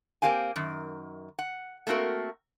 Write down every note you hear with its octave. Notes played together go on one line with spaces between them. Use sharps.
A#3 C4 G4 F5 G#5
F#2 D#3
F#5
A3 A#3 C4 F#4 A#4